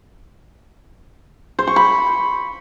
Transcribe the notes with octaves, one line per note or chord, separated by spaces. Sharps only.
C5
C#6
B5